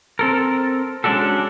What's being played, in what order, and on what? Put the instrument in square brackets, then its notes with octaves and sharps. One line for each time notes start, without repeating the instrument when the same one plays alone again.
[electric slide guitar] C4 A4 A#4
G#3 C#4 D4 F#4 A4